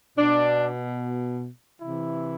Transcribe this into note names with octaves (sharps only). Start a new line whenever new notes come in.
B2 D4
C3 E3 E4